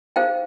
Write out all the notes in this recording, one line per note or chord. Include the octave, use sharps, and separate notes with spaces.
D#4 G#4 C5 F5 G5